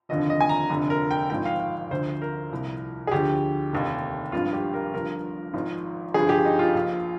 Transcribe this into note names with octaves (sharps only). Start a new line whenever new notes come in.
F1 D#2 D3 F3 D#5
D#5
G#5
A#5
F1 F2 D3
A#4
G5
G#1 G#2 F3 G5
F5
F5
D2 D3 F3 C5
A#4
C2 A#2 F3
G#4
D2 D3 F3 G4
F1 D#2 D#3
G#1 G2 F3 F4
G4
A#4
G1 G2 F3 A#4
G#1 G#2 F3
G1 G2 F3 G#4
G4
D#4
F4
A#1 A#2 F3